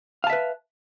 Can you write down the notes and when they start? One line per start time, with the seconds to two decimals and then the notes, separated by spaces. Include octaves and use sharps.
0.24 F5
0.27 A5
0.30 E5
0.33 B4